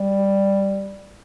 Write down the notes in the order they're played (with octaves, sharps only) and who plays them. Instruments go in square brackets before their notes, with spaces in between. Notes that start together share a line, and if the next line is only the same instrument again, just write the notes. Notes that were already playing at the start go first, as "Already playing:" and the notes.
Already playing: [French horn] G3